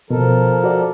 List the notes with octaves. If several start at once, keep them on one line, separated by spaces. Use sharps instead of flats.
B2 F3 A4 A#4
F#4 D5